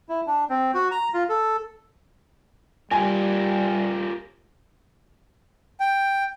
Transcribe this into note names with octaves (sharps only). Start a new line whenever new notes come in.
E4
D4
C4
F#4
A#5
F4
A4
G3 F4 G4 A#4 G#5
G5